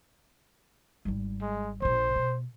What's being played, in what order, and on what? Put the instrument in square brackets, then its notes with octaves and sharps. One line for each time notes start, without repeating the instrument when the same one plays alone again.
[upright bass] G#1 G3
[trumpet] G#3
[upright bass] A#1 A#2 [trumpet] C5
[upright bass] B2